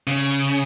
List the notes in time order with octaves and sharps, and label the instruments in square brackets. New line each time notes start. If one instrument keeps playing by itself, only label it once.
[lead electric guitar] C#3